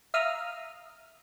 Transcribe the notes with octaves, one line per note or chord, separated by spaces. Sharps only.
E5 F5 A#5 D#6 F6